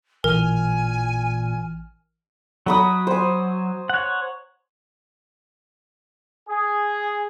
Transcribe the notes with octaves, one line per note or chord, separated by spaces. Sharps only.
A1 A#2 E3 A#4 G#5 F6
F#3 A#5 B5 D#6
C5 G#5
C#5 F#5
G#4